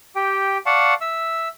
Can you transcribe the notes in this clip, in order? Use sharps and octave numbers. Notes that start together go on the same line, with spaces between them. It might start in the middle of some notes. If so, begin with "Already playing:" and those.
G4 G5
D5 F5 F#5 A5 C#6
E5 E6